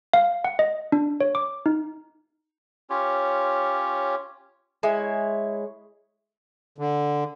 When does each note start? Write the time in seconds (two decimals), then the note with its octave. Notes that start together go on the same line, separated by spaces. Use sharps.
0.13 F5
0.44 F#5
0.59 D#5
0.92 D4
1.21 C#5
1.35 D6
1.66 D#4
2.90 C#4 F4 G4 C#5
4.83 G#3 E4 C#5
6.78 D3